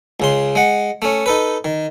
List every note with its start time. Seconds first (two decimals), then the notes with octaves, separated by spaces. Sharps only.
0.20 C#2 C#3 C6
0.55 G#3 F#5
1.02 A3 C#4
1.26 D#4 A4 B4
1.64 D#3